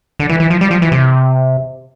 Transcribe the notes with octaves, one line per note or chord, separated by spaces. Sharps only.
D3
E3
E3
F3
G3
F3
E3
C3